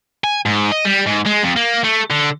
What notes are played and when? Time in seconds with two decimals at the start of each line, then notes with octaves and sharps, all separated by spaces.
0.24 G#5
0.46 G#2
0.72 D#5
0.85 G3
1.06 G#2
1.26 G#3
1.43 F2
1.56 A#3
1.84 A3
2.11 D3